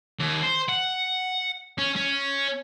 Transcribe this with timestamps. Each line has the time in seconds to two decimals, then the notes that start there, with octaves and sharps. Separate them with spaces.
0.19 D#2
0.42 C5
0.69 F#5
1.78 C#4
1.96 C#4